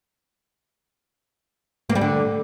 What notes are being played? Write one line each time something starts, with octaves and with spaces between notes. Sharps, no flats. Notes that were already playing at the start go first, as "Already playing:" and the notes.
A#3
G3
D3